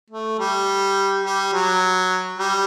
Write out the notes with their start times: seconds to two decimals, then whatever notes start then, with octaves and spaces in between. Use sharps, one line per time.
0.10 A3
0.39 G3
1.24 G3
1.53 F#3
2.39 G3